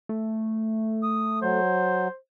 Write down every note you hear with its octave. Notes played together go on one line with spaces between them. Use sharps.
A3
D#6
F#3 C5